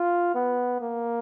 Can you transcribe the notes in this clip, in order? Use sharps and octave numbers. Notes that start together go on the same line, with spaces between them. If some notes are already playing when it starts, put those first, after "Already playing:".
Already playing: F4
B3
A#3